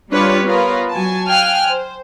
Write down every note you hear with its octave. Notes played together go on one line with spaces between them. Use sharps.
G3 D4 F4 G4 B4 C#5
B3 F4 A#4 B4 C#5 F5
F#3 G#5 A5
F5 G5 G#5 F6 F#6
C5